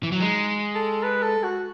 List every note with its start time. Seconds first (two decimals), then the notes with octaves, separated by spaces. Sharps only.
0.03 E3
0.12 F#3
0.20 G#3 D#4
0.75 A4
1.03 B4
1.22 A4
1.43 F#4